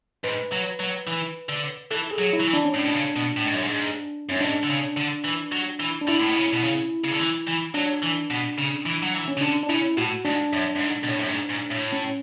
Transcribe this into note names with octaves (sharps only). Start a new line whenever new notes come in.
G#2 B4
F#3
F#3
E3
D3
E3 A4
G#4
F#3
E4
F#3
E3
D4
C#4
A2 D4
B2
C#3
B2
A2
G#2
F#2
G#2
F#2 C#4
G#2 D4
D3
C#3
D3
E3
F#3
E3
D4
D3 E4
A2
B2
C#3
B2
C#3
C#3
D3
E3
E3
F#3 D4
E3
B2
C#3
E3
F#3
E3
C#4
C#3
D3 D4
D4
C#3 E4
A2 F#4
G#2 D4
F#2
F#2
G#2
B2
A2
F#2
G#2
G#2
A2
C#4